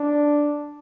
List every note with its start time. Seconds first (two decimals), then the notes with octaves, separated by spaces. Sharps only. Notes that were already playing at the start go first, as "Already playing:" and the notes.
Already playing: D4